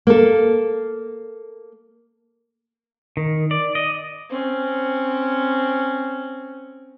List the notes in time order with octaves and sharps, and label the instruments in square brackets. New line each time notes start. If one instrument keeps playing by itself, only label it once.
[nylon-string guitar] A#3 A4
[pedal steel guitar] D#3
D5
D#5
[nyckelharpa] C4 C#4